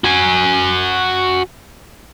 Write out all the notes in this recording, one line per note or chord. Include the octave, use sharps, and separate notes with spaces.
F#4 G#5